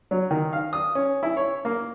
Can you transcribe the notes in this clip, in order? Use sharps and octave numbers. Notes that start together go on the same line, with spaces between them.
F#3
D#3
F5
D#6
C#4
E4
C#5
A#3